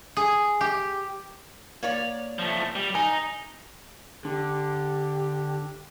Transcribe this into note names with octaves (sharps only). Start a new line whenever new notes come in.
G#4
G4
A#3 C#5 D5
F3 A3
G3
D#4 G#5
D3 G4